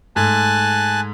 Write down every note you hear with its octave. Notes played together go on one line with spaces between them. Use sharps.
G#2 A3 G#5 A5 F#6